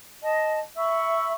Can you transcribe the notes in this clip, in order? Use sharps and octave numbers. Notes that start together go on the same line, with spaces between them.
D#5 A5
E5 B5 C#6 E6